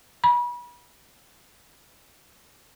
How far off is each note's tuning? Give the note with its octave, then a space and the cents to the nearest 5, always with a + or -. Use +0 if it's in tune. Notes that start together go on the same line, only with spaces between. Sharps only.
B5 -35